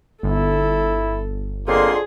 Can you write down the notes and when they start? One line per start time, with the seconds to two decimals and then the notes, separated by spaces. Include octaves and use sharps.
0.23 G1 E4 A4
1.68 F2 D3 A#3 G#4 C6